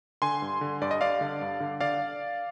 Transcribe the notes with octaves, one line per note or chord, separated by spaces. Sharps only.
D3 G#5 C6
G2
D3
G2 D5
D#5
G2 D5 F5
D3
G2
D3
D3 D5 F5